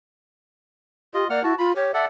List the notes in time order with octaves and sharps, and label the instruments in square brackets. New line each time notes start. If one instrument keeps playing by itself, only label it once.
[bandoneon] F4 D#5 [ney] G4
[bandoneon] A#3 F#5 F6 [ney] D5
[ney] E4 [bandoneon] F#4 A5
[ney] F4 [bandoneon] B5
[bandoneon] G4 [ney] C#5
[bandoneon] A4 D5 F#5 [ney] E5